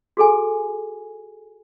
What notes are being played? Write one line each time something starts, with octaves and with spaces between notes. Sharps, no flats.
F#4 G#4 A4 G#5